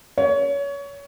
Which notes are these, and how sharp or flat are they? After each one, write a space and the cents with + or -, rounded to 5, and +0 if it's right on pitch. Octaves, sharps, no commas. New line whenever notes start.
C#5 +25